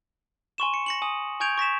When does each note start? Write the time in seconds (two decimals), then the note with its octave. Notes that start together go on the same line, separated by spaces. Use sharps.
0.58 G#5 C6 C#6 E7
0.74 C#7
0.86 A#6 C#7 F#7
1.02 G#5 D#6
1.40 G#5 C#6 G6 G#6 D7 F7
1.58 C#6 A#6 B6 E7